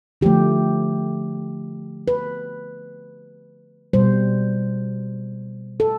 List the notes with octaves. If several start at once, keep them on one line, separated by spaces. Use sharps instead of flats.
D3 F3 A3 G4
B4
B2 G3 C5
A4